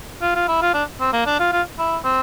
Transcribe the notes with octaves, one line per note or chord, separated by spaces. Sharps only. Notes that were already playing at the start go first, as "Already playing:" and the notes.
F4
F4
E4
F4
D4
C4
A#3
D4
F4
F4
E4
C4